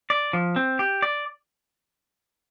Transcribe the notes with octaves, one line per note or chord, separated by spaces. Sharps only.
D5
F3
C4
G4
D5